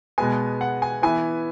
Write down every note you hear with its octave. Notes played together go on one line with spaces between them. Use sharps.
B2 G#3 B3 G#5
F#5
G#5
E3 B3 G#5